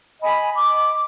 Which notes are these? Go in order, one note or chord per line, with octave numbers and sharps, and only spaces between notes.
D#5 G#5 B5
D6